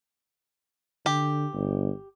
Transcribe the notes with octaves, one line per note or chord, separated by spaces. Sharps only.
D3 G4
G1